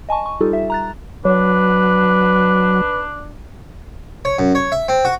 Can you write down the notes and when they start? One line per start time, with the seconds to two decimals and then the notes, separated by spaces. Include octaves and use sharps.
0.09 D#5 G#5 A5 C#6
0.26 C#6
0.41 G3 D#4 F4 G4 A4
0.53 E5
0.70 A#5 F#6 A6
1.25 F#3 D4 B4
4.25 C#5
4.39 F#2
4.55 C#5
4.72 E5
4.88 C4
5.05 F#4